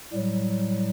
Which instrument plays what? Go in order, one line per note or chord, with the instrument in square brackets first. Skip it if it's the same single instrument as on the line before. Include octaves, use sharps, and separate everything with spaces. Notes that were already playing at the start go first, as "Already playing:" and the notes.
[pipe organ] A2 F#3 G3